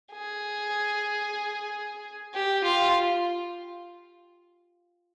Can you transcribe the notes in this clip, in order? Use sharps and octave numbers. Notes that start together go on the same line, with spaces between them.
G#4
G4
F4